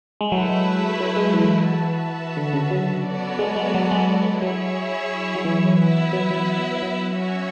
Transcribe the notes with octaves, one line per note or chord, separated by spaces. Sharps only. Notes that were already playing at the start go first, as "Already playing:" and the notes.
G#3
F#3 A3 E4 B4 E5
G#3
F#3
G#3
E3
F#4 B4 E5 A5
D3
C#3
F#3
B3 F#4 A4 D5
G#3
G#3
F#3
G#3
F#3 E4 G#4 C#5 E5
F#3
E3
B3 E4 B4 E5
F#3
F#3
F#3
C#4 F#4 C#5 E5